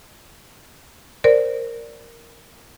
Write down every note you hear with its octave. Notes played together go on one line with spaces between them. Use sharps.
A#4 C5 D5